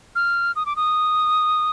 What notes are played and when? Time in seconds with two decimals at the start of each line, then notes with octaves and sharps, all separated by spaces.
0.15 F6
0.56 D#6
0.66 D6
0.76 D#6